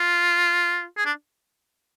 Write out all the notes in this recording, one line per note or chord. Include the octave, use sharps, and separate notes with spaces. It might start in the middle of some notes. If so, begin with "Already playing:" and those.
Already playing: F4
G#4
D4